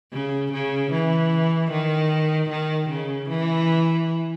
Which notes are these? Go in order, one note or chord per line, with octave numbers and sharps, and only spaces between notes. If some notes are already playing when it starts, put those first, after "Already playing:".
C#3
C#3
E3
D#3
D#3
C#3
E3